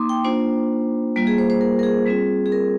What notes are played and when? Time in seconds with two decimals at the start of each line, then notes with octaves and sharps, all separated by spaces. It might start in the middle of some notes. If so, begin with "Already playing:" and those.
Already playing: A#3 D#4 C6 D6 D#6
0.09 G5
0.24 A#3 D4 F4 C5
1.16 G3 A#3 F4
1.27 G#4
1.38 C5
1.50 C5
1.61 A#4
1.79 A#4
1.83 G#4
2.06 G3 C4 F4 G#4
2.46 G#4
2.52 A#4